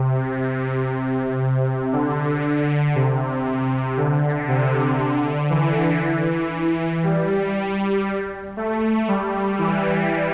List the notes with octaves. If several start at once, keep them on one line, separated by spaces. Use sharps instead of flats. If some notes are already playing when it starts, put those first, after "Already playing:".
Already playing: C3
D3
C3
D3
C3
D3
E3
E3
G3
A3
G3
E3